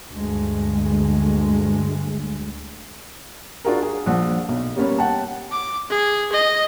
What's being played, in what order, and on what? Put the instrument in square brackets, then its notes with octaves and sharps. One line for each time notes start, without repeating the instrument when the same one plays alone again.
[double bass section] D2 G2 G#3
[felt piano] D4 F4 F#4 G#4 A#4
G#4
A#1 F3 F#5
B1
G3 A#3 B3 C#4
F#5 G5 A5
[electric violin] D6
G#4
D#5